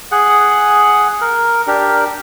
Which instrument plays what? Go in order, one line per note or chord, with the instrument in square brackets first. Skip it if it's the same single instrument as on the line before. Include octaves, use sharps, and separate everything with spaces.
[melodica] G#4 F#5
A#4
D4 G4 A#4